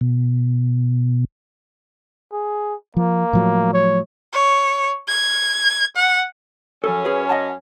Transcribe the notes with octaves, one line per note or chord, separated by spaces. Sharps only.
B2
G#4
F3 A#3
A2 F3 F#3
C#5
C#5
G#6
F#5
F#2 F3 C#4 A4
G#4 B4
D#5 F#5 A5